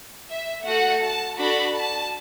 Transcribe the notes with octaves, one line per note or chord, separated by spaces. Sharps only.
E5
A3 F#4 A4 F#5
A5
D4 F#4 A4 B5
A5